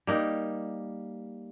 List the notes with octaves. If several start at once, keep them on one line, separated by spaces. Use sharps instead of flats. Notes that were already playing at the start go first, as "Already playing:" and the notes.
G3 A#3 D#4